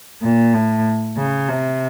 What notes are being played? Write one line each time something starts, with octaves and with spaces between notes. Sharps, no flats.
A#2
A2
C#3
C3